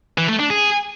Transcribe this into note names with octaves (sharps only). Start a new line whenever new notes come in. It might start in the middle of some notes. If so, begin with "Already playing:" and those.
E3
A3
D4
G#4